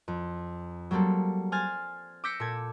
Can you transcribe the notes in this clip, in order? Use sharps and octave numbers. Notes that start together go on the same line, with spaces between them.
F2
F#3 G3 A#3 C4 A4
C5 G#5 F6 G#6 A6
D6 E6 G6 A#6 B6 C#7
A#2 A4 G#6